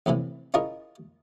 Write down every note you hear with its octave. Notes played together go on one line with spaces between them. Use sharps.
A1 A2 C3 E3
C#4 E4 F4 G#4 A#4 D#5